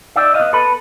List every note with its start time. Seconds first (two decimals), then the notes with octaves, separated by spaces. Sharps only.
0.16 D#4 D5 E5
0.34 D#5 F5
0.41 B3
0.53 A4 B4